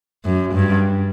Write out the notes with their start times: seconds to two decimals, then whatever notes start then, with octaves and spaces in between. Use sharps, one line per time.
0.25 F#2
0.54 G2